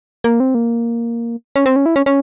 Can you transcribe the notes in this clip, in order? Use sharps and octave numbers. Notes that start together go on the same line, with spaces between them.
A#3
C4
A#3
C#4
C4
C#4
E4
C#4
C#4